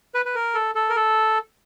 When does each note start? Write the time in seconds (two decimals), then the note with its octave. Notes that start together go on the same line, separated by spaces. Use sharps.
0.14 B4
0.26 B4
0.35 A#4
0.54 A4
0.75 A4
0.90 A#4
0.96 A4